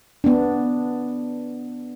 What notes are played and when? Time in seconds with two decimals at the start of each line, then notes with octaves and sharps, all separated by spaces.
0.24 B3 D4